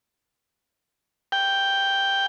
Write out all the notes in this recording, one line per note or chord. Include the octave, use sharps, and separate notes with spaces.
G5